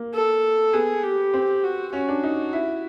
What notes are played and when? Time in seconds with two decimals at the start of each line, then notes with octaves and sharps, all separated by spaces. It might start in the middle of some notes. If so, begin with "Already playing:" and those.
Already playing: A#3
0.14 A4
0.73 B3 G#4
1.03 G4
1.34 C4
1.63 F#4
1.93 C#4 F#4
2.08 D4
2.24 D#4
2.53 E4